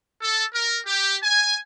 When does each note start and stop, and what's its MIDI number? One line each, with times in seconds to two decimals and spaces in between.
0.22 0.43 69
0.53 0.78 70
0.87 1.16 67
1.23 1.57 80